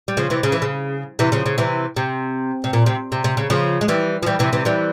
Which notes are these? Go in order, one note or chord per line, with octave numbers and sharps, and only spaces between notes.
G3
C#3 F3
C3 E3
C#3
E3
C#3
C3 E3
C#3 F3
C#3
C3 E3
C3
C3
A#2
C3
C3
C3
C#3
C#3 F3
G#3
E3 G3
F3
E3 G3
C3 E3
C3 E3
E3 G3